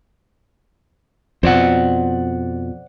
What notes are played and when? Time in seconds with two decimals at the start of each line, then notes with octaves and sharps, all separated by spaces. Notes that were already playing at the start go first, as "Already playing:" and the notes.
1.43 F2 B2 C5 D5 F#5